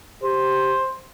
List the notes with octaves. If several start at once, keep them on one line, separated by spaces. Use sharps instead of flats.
G4 C5